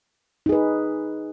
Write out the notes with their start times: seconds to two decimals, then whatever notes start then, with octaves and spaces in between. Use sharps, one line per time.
0.46 D#4
0.49 G#4
0.52 B4